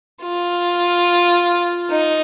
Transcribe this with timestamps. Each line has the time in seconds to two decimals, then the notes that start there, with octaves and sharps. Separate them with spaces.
0.23 F4
1.91 D#4